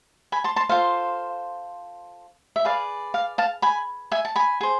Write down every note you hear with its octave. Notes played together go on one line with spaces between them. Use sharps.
G#5 B5
A5 C6
A5 C6
F4 A4 C5 F5
E5
G#4 B4 D5 F5
F5
F5 A5
G#5 B5
E5 G#5
A5
G#5 B5
G#4 C5